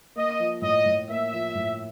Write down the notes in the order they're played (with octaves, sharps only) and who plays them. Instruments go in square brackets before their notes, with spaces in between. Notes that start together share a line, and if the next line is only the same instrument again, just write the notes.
[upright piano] A#3 [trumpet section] D#5
[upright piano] F3
[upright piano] A2 [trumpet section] D#5
[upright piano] A2
[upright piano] A#3 [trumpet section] E5
[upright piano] F3
A2